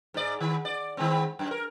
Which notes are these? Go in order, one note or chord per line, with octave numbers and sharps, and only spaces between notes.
G#2 D5
D#3
D5
D#3 G#3 C4
F#2
A#4